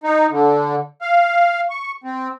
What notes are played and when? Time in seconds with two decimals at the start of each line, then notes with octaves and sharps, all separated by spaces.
0.04 D#4
0.31 D3
1.02 F5
1.70 C#6
2.04 C4